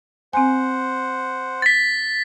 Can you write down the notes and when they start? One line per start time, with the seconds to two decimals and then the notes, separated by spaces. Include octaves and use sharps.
0.33 C4 C5 F#5 G#5
1.62 A6 B6